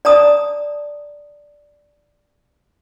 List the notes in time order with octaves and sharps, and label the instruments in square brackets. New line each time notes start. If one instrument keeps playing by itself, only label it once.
[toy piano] D5 A5 A#5 D#6